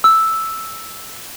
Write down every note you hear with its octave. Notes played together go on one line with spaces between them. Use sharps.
E6